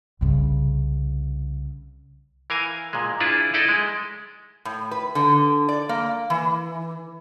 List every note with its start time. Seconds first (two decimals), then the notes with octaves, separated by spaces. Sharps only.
0.21 C2 C#3
2.50 E3 A#4 F5 G#5
2.93 A#2 G#3
3.20 D4 E4 F4 G#4 B4
3.54 D#4 E4 A4 D5 D#5
3.69 G#3
4.65 A2
4.91 B4
5.15 D3
5.69 D5
5.89 A#3
6.30 E3